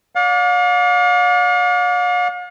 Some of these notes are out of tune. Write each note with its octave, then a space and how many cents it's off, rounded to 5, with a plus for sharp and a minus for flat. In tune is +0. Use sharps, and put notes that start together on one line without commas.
D5 -25 F5 +45